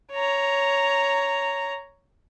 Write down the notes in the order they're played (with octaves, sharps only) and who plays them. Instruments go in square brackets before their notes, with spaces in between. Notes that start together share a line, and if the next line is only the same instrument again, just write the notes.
[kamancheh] C#5 A#5